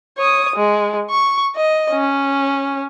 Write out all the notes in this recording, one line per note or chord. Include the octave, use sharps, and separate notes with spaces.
C#5 D#6
G#3
C#6
D#5
C#4